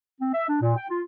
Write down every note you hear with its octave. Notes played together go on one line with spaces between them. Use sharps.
C4
E5
D4
A#2
G5
F4